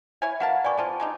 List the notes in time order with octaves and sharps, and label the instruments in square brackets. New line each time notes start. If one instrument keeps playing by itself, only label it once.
[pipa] E4 C#5 G#5
[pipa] B2 A#4 A5 [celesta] F5 F#5
[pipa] G4 B4 [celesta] D5 G#5 C#6
[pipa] B3 C4 F4 [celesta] G#5 A5
[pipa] G#3 D4 D#4